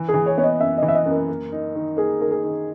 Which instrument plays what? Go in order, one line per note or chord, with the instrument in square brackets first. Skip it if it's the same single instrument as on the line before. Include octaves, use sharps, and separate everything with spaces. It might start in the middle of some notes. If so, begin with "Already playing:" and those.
Already playing: [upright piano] E3
[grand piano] G#4
[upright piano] E3
[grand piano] C#5
[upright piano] B3 [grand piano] C#5
[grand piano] D#5
[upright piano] F#2 [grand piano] E5
[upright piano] E3 [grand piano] D#5
[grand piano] E5
D#5
[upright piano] F#2
[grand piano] A#4
[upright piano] A#3
D#4
D#3
[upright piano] A#3 [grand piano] G#4
[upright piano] D#3 [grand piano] A#4
[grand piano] G#4
[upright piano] D#3